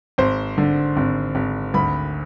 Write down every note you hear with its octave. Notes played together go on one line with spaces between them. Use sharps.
G#1 C5
D3
G#1
G#1
D2 B5